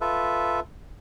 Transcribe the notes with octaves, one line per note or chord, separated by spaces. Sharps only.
F4 A4 B4 E5